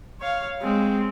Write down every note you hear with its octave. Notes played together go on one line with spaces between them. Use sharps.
C#5 F5
G#3 C4